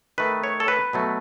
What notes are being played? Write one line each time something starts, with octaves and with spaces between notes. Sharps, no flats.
D#3 A3 B4
C#5
A4
B4
B2 F#3 A3